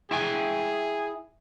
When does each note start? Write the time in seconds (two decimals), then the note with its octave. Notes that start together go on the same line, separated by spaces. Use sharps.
0.11 E4 G#4 G5 G#5